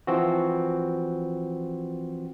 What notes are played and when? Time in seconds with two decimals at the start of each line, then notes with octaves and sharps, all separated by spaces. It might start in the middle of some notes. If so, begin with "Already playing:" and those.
0.07 E3 F3 C4 F#4